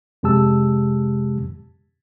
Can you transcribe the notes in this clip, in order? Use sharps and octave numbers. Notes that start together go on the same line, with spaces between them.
F2 C3 G#3 G4 A5 E6